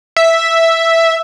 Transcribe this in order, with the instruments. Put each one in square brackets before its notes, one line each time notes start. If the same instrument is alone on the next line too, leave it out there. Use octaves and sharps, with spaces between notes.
[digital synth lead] E5